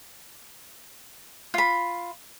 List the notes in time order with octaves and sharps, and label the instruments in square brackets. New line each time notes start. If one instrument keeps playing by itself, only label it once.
[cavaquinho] F4 B5